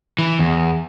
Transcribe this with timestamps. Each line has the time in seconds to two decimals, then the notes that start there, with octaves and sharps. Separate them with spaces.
0.19 E3
0.39 E2